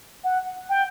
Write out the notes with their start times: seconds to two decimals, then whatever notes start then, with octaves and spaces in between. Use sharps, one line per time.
0.24 F#5
0.69 G5